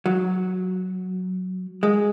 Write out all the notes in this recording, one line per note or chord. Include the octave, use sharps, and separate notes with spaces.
F#3
G#3